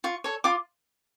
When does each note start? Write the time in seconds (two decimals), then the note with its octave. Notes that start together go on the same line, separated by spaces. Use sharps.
0.04 F4 C#6
0.24 A4 C#5
0.44 F4 D6